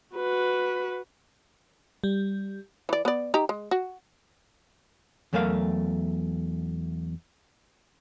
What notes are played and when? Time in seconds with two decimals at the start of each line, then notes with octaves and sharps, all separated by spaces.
0.14 F#4 B4
2.04 G3
2.89 E3 D5
3.05 B3 D5
3.34 D#4 G4 A#5
3.49 G#3
3.71 F#4
5.33 E2 F#3 A3 A#4 F5